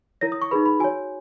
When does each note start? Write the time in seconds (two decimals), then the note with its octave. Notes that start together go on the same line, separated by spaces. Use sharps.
0.21 E4 A#4 C#5 A#6
0.32 D#6
0.42 C#6
0.51 D#4 G#4 B4 B5
0.66 B5
0.80 F#4 G#5
0.84 C#5